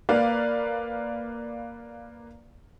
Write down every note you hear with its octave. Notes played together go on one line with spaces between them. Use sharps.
A#3 B4 D5 F5